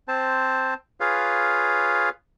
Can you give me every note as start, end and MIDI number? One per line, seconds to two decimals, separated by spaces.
0.08 0.74 60
0.08 0.74 72
0.08 0.74 81
1.00 2.09 65
1.00 2.09 68
1.00 2.09 71
1.00 2.09 73
1.00 2.09 77